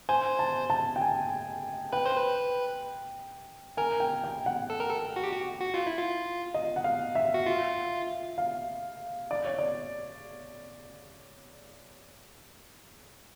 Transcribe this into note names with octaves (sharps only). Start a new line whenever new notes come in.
C5 G#5
A5
A5
G5
G#5
B4 G5
C5
B4
A#4 G#5
G5
G5
F#5
A4
A#4
A4
F#4
G4
F#4
F#4
F4
E4
F4
D#5
F#5
F5
E5
F#4
F4
F5
D5
C#5
D5